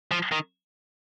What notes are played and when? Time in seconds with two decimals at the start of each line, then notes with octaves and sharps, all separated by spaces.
0.11 F3
0.32 D#3